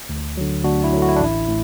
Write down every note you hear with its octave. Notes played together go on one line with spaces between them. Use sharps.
D2
D3 F#3
D2 D4 F#4
E4
D3 F#3
F#4
E4
D4
A1 E4
A2